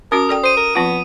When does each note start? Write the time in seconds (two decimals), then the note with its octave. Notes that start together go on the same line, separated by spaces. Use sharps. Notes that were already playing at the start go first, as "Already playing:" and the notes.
0.12 C#4 F#4 A#4 D#6
0.29 A4 D5 G5
0.44 C5 D#6 D#7
0.57 A#4
0.75 F3 B3 C4 F4